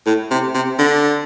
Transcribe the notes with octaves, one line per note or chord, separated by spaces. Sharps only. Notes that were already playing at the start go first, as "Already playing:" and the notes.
A2
C3
C3
D3